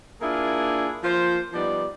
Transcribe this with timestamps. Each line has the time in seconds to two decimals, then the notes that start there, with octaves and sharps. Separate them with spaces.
0.22 A#3 D4 E4 F4 G#4
1.04 F3 A#3 F4 C5
1.53 F3 G3 B3 D#4 D5